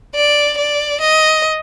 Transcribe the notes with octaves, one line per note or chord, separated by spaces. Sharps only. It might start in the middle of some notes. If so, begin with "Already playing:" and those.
D5
D5
D#5